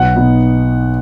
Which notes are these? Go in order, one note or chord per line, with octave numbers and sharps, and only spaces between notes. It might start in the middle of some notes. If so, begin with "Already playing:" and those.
Already playing: B1 F#5
B2 B3 D#4